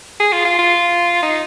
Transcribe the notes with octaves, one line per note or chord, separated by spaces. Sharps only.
G#4
F4
F4
F4
D#4